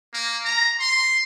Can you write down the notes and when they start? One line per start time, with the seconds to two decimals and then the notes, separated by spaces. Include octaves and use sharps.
0.14 A#3
0.45 A#5
0.80 C6